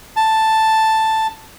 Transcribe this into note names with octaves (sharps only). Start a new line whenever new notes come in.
A5